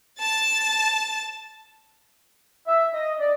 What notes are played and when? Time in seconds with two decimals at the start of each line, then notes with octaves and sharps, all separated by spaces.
0.19 A5 A6
2.67 E5
2.93 D#5
3.20 D5